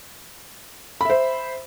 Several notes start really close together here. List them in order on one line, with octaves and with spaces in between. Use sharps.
B5 E5 C5